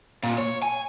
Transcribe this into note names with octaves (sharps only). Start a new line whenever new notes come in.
A#2
C#5
G#5